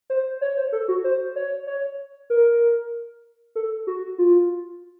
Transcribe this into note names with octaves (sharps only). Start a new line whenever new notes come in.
C5
C#5
C5
A4
F#4
C5
C#5
C#5
A#4
A4
F#4
F4